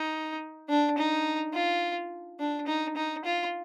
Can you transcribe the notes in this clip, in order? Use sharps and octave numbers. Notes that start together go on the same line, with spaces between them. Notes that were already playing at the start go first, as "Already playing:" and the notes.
Already playing: D#4
D4
D#4
F4
D4
D#4
D#4
F4